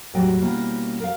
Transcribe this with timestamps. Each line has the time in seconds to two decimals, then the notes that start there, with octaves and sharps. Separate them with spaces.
0.14 E2 A2 F#3 G3 D#5 G5
0.41 B2 G3 A#3 B3 C#4 E4
1.00 A#4 F5